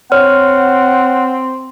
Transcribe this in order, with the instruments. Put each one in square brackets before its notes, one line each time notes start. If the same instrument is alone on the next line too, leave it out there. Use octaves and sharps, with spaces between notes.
[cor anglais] C4 [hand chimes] C#5 F6 [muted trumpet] F#5